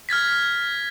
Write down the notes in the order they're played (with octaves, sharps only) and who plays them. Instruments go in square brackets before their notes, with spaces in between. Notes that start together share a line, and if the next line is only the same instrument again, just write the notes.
[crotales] F6 G#6 A6 B6